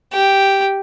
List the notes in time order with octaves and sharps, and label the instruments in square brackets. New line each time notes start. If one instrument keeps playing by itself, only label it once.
[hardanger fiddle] G4